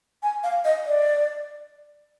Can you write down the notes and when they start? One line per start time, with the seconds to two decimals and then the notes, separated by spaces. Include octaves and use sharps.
0.23 G#5
0.44 F5
0.65 D#5
0.86 D5